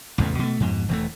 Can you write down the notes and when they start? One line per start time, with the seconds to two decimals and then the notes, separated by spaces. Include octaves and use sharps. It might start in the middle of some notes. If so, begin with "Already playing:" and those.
0.18 A1 E2 C#3 A3
0.39 B2 G#3 A3
0.60 F2 G#2 B2
0.88 E1 E3 F#3 A3